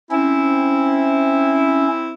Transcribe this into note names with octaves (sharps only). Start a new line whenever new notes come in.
C4 C#4 E4